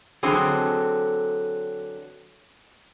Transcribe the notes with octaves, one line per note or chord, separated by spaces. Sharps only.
D3 E3 F#3 C4 D4 G#4